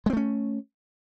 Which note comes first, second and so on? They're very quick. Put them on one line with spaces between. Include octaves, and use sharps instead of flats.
G#3 C4 A3 C#4